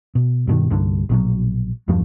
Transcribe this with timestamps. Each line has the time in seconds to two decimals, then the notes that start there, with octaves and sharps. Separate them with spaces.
0.15 B2
0.47 G2 B2 D#3
0.70 C2 G2 D3
1.09 A#1 B2 F#3
1.88 E2 G2 F3 A3